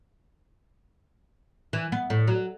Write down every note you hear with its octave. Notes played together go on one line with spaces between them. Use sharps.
E3
B3
A2
F#3